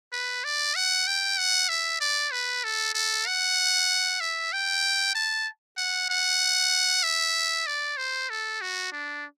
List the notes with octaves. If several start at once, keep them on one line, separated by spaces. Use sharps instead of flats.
B4
D5
F#5
G5
F#5
E5
D5
B4
A4
A4
F#5
E5
G5
A5
F#5
F#5
E5
D5
C5
A4
F#4
D4